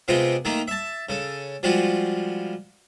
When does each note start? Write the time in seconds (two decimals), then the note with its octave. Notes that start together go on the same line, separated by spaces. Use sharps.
0.08 C3 G#3 B3 F4 D#5 G5
0.45 D#3 A3 A#3 D#4
0.68 E5 A5
1.09 C#3 A4
1.63 F3 G3 G#3 F4 F#4